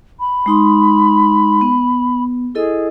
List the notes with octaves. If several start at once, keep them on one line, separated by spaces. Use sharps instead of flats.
B5
G#3 D#4 C6
B3
E4 G#4 A4 D#5